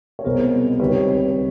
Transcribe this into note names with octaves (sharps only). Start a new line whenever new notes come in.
C#5
C2 B2 G#3 B3 A#4 C5
C#2 C3 D#3 G3 B4 C#5